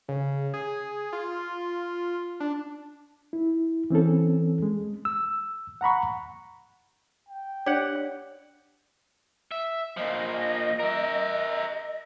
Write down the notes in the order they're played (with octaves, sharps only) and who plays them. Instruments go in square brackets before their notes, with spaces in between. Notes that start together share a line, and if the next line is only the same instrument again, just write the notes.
[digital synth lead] C#3
G#4
F4
D4
[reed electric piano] E4
E3 C4 C#4 A4
G#3
E6
F#5 A#5 B5 C#6
[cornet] G5
[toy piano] D4 C#5 D5 [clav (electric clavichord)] G4 F#5
[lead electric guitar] E5
[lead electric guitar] A#2 F3 [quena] D#5
[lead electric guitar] A#4 E5